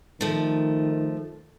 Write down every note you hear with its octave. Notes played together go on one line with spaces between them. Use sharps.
D#3 F3 A3